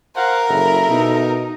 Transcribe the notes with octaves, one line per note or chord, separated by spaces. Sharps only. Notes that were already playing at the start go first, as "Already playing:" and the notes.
A#4 C5 F5 F#5
F#1 E4 A4
B2 D#4